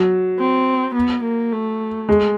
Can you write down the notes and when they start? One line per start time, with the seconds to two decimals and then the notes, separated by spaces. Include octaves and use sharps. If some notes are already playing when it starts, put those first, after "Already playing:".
Already playing: F#3
0.39 C4
0.95 B3
1.24 A#3
1.52 A3
2.09 G#3